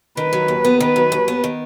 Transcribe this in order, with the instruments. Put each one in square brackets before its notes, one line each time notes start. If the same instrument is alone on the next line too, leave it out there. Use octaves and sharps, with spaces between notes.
[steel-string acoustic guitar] D#3 [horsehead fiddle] B4
[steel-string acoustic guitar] F#3
D#2
B3
[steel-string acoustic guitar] D#3 [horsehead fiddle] B4
[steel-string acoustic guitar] F#3
D#2
B3
D#3